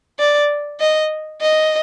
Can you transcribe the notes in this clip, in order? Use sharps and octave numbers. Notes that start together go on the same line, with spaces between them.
D5
D#5
D#5